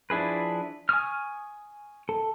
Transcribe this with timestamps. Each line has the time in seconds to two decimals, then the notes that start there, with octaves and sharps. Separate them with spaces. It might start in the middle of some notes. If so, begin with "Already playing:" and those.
0.10 F3 D4 E4 G#4 B4
0.89 G#5 C#6 D#6 F6
2.09 A4